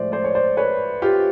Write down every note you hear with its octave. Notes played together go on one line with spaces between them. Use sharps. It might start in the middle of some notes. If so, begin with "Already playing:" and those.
Already playing: A2 F3 G#3 C5 D5
C5 D5
C#5
C5 D5
B4 C#5
F4 G4